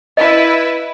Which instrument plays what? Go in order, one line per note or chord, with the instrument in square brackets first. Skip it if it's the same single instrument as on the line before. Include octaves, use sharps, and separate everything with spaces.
[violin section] E4 B4 [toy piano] D#5 F5